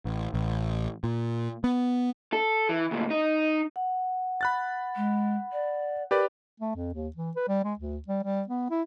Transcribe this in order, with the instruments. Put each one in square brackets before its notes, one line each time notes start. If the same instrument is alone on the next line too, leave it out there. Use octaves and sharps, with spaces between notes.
[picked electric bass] A1
A1
A#2
B3
[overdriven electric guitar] A4
E3
D2 A#2
D#4
[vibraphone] F#5
[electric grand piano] B5 F#6 A6
[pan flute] G#3
D5
[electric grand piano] G4 B4 D5 [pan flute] A#4
[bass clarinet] A3
F2
D#2
E3
B4
G3
G#3
D2
G3
G3
B3
E4